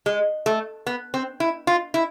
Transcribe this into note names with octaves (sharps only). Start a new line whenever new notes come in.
G#3
A3
B3
C4
E4
F4
E4